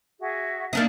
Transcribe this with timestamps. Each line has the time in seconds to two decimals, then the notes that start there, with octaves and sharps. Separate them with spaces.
0.19 F#4 G#4 E5
0.73 A#3 D4 D#4 E5